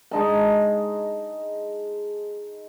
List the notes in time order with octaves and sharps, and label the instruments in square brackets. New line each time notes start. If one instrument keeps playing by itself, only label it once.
[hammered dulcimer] G#3 D#4 A5